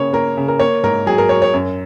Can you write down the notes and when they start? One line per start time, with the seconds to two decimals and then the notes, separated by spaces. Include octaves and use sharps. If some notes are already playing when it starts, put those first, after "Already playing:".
Already playing: C#3 A#3 C#5
0.13 A#3 A#4
0.37 C#3
0.48 A#4
0.60 A#3 C#5
0.83 G#2 A#4
1.06 F#3 G#4
1.18 A#4
1.29 F#3 C#5
1.42 C#5
1.53 F#2